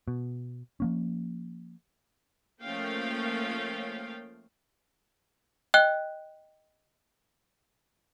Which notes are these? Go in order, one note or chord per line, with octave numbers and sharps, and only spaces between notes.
B2
F3 A#3 C#4
F3 A3 A#3 C#4 F5 G5
D#5 G5 F#6 G7